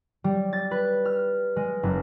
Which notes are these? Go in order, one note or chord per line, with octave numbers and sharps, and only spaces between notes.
G3
A6
B4
F6
G#3
F#1